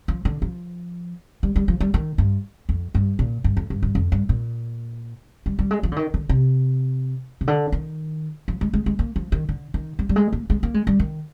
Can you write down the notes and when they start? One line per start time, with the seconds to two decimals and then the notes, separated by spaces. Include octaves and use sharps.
0.08 F3
0.25 D3
0.42 F3
1.43 G3
1.56 G3
1.68 F3
1.80 G3
1.94 D#3
2.18 G2
2.69 F2
2.95 G2
3.19 A#2
3.44 G2
3.57 F2
3.70 G2
3.83 G2
3.95 F2
4.12 G2
4.29 A#2
5.46 G3
5.59 G3
5.71 G#3
5.83 F3
5.92 D3
5.96 D#3
6.14 D3
6.29 C3
7.41 C3
7.48 D3
7.72 D#3
8.48 F3
8.61 G#3
8.73 G#3
8.86 G#3
8.99 A#3
9.16 F3
9.32 D#3
9.49 D3
9.74 D#3
9.99 G3
10.09 G3
10.16 G#3
10.33 A#3
10.50 G#3
10.63 A#3
10.74 G#3
10.87 G3
11.00 D#3